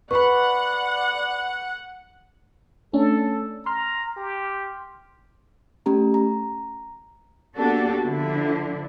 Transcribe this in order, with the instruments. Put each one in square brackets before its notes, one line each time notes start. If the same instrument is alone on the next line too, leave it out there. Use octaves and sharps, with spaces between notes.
[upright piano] B4 [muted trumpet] D5 [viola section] F#5 [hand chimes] B5 C#6
[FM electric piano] A3 C#4 D4 [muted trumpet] A4
[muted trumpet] A#5 [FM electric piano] C6 F6
[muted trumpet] G4
[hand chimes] A3 C#4 G4 A#5
A#5
[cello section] A#3 B3 D4 F#4 G4 A4
D3 F3 D4 E4